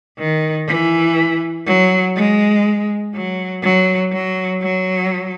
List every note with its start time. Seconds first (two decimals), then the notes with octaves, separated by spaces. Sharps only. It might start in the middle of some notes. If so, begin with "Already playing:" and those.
0.18 D#3
0.67 E3
1.66 F#3
2.16 G#3
3.14 F#3
3.63 F#3
4.12 F#3
4.62 F#3